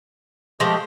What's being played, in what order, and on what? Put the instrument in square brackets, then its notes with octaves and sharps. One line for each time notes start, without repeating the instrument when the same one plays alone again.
[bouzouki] F3 G#3 [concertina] A3 G4 D#5